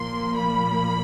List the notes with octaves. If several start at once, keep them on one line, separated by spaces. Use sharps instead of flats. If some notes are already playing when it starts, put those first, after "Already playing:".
Already playing: A#2 F3 A#3 C6
B5